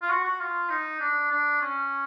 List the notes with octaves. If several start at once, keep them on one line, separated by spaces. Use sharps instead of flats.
F4
F#4
F#4
F4
D#4
D4
D4
C#4